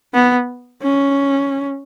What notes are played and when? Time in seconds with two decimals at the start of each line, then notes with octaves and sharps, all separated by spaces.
0.14 B3
0.83 C#4